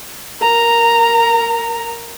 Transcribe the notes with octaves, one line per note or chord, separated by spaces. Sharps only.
A#4 A#5